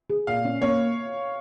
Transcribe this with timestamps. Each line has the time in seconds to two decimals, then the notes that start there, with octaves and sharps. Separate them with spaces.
0.09 G#4
0.27 A#2 F5
0.45 C#4
0.62 A#3 C#5